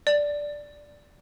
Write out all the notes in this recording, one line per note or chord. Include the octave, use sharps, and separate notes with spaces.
D5